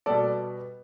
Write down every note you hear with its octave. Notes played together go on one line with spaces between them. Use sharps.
B2 G3 B3 A4 D5